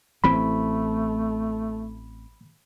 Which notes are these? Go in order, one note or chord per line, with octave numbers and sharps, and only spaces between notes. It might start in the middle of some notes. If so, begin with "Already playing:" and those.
A1 E3 A3 C4 B5